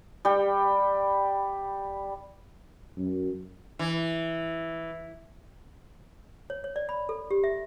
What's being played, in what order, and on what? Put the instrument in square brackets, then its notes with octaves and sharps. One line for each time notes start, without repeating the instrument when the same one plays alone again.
[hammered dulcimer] G3 G5
[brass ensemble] F#2
[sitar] E3
[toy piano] C#5
C#5
D5
B5
A4
G4
E5